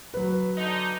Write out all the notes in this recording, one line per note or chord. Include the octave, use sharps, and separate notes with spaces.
F#3 B4
D3 D#4